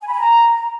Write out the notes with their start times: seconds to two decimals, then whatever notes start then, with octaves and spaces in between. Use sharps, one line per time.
0.01 G#5
0.07 B5
0.14 G#5
0.20 A#5